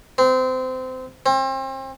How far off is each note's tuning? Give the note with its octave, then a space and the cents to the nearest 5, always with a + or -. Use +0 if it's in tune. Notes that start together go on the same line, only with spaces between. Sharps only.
C4 -25
C4 +35